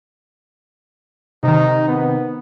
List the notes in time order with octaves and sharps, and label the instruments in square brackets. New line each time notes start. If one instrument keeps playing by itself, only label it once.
[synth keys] C3 D#3 [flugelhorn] D#4
[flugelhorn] B3